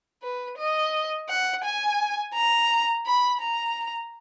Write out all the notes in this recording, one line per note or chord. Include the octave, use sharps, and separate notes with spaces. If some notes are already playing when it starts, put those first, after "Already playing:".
B4
D#5
F#5
G#5
A#5
B5
A#5